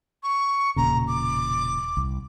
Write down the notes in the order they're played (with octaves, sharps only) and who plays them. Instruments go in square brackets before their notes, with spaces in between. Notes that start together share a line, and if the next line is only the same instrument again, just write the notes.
[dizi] C#6
[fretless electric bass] E1 A#2 C#3 [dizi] A#5
[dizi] D6
[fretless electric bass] C2